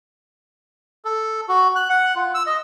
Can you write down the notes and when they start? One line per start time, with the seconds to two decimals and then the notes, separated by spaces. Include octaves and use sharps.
1.05 A4
1.48 F#4
1.76 F#6
1.89 F#5
2.16 F4
2.34 E6
2.46 D#5